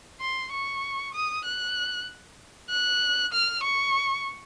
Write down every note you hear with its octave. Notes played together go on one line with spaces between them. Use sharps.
C6
C#6
D#6
F#6
F#6
F6
C#6